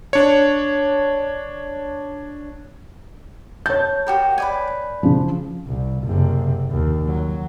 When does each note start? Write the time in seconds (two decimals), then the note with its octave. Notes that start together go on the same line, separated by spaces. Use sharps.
0.13 D4 C#5
3.66 C#5 A5 G6
4.07 F#4 G4 A#4
4.38 B4 D5 G#5
5.03 C#3 F3
5.66 C2
6.04 F#1 C3
6.70 D#2
7.07 F#3